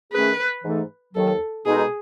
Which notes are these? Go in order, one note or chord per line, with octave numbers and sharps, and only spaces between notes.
D#3 A3 C#4 G#4 B4
G#2 E3 A3 D#4 A4
D#2 D#3 F#3 A4
B2 G#3 D#4 G#4 A4